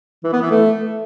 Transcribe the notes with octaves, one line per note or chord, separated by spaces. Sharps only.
E3
B3
E3
A3